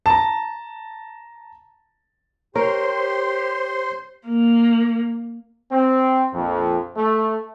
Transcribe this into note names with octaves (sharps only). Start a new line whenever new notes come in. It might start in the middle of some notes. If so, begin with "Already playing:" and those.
A5 A#5
G4 A#4 C5 C#5 C6
A#3
C4
A#1 F2
A3